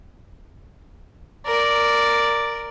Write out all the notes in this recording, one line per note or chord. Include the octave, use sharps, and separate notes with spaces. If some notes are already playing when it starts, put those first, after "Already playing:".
A#4 D5